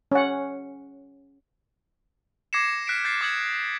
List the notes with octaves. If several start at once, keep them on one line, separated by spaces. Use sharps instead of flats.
C#4 F#5
D6 G#6 A#6 C7 C#7 E7
F6 F#6 B6 C7 D7 E7
G6 A6 C7
D6 D#6 G#6 C#7 F#7